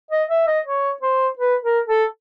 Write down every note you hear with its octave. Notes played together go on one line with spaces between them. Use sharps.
D#5
E5
D#5
C#5
C5
B4
A#4
A4